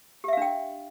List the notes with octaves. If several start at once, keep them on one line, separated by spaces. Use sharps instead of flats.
D4 G4 E5 F5 G5